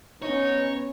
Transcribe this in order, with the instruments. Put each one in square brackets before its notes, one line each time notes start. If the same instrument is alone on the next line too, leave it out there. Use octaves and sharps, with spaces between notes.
[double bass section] B3 C#4 [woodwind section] D#4 [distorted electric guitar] C#5